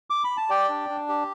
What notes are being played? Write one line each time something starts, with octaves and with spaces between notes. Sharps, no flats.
D6
B5
A5
G4 D5 G5
D4
D4
G4